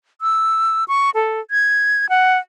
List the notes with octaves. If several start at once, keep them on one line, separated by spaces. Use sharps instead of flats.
E6
C#6
A4
G#6
F#5